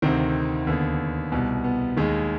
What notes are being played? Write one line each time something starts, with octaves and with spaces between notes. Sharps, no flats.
D2 C3 D#3 C4
D#2 D3 B3
C2 B2
B3
D#2 D#3 G#3